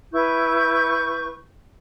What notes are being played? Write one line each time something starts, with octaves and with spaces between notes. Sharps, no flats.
E4 B4 C#6 G6